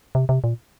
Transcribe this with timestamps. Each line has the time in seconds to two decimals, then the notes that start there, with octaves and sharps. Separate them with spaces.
0.15 C3
0.29 C3
0.44 A#2